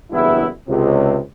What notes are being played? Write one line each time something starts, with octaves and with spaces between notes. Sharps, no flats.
F#1 E2 G2 B3 E4
C#2 C3